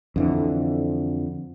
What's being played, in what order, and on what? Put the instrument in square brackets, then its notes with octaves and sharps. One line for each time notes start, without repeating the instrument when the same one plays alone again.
[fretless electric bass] F2 D3 E3